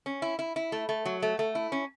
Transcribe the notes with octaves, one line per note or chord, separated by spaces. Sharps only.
C#4
E4
E4
E4
A3
A3
F#3
A3
A3
E4
C#4